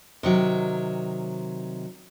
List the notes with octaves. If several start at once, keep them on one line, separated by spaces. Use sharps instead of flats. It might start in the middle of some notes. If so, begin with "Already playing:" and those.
C3 D#3 F#3